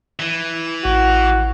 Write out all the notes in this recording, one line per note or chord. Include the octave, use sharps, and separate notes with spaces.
E3
A1 F#4